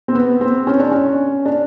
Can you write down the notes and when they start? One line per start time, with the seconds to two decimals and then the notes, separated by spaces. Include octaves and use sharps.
0.08 C4
0.15 B3
0.41 C4
0.67 C#4
0.79 D4
0.91 C#4
1.46 D4